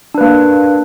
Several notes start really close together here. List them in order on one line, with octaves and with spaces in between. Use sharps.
D4 B4 A#3